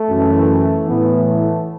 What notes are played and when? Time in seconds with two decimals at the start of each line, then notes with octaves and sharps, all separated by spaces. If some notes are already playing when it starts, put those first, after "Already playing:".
Already playing: A3
0.09 F#2 E3
0.86 A2 E3 B3
1.24 A3